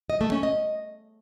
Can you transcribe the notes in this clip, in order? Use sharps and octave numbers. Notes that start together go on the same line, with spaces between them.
D#5
A3
C#4
D#5